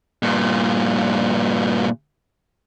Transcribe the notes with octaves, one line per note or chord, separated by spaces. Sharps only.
G2 A#2